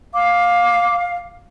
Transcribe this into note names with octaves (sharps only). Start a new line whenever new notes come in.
F5 D6